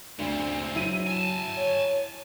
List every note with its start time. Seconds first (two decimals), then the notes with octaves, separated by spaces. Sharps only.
0.19 D2 C#3 C4 D4
0.76 F#3 E4 D#7
1.07 G#5 A5
1.57 C#5